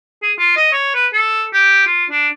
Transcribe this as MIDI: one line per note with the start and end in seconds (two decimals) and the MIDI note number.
0.23 0.32 68
0.39 0.56 65
0.57 0.68 75
0.72 0.94 73
0.95 1.07 71
1.13 1.46 69
1.53 1.84 67
1.87 2.05 65
2.10 2.28 62